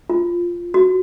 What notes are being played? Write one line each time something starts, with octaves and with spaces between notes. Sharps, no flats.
F4
F#4